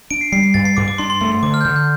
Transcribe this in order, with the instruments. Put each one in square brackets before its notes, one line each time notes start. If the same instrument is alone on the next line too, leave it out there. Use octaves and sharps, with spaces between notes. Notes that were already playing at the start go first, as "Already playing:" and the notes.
[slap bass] D4 [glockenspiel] D7
[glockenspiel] C7
[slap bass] G3 [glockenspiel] C7
[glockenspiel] C7
[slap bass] G2 [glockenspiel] A6
[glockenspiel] C7
[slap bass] G2 [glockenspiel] D6
[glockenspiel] D6
[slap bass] D4 [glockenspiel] C6
[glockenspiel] C6
[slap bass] A3 [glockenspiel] C6
[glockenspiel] C6
[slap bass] D3 [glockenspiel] D6
[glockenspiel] F6
G6
[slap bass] D3 [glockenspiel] F6
[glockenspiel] G6